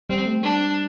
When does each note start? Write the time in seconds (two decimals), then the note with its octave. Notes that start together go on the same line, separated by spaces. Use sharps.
0.10 G3 C4
0.26 A3
0.42 G3 D4